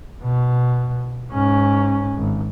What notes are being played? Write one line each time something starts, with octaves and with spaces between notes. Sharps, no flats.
B2
G#2 C#4
G#1